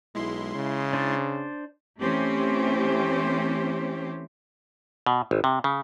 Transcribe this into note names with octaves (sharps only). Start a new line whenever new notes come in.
B1 G#3 E4 C6
C#3
D4 C5 D5
E3 A3 C4 C#4 G4 C5
B2
G#1
C3
C#3